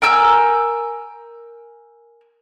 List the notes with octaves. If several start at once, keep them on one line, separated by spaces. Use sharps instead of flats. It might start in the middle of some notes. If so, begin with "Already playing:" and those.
A#4 G#5 E6 G6